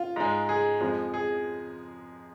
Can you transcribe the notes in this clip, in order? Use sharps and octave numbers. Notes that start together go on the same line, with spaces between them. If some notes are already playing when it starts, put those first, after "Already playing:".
Already playing: F4
G#2 G#3
G#4
F2 F3 G#3
G#4